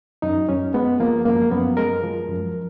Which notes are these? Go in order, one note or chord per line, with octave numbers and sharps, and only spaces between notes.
F#2 D#4
F#2 C#4
G#3 B3
F3 A#3
F#2 A#3
F#2 B3
G#3 A#4
F3
F#2